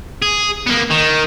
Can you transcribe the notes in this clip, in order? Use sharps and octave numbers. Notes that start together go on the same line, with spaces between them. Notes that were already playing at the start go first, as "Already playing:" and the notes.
G#4
A#3 B3
D#3